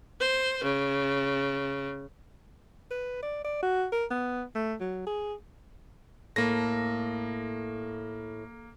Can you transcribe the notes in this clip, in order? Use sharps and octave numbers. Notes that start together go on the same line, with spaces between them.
C5
C#3
B4
D5
D5
F#4
A#4
B3
A3
F#3
G#4
A2 A#3 A#6